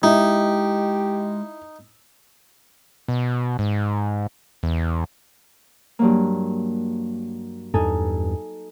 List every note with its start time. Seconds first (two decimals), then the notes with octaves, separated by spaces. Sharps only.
0.03 G#3 D#4 E4 G4
3.08 B2
3.59 G#2
4.63 E2
5.99 G2 F#3 A#3
7.74 E2 G2 D#4 A4 G#5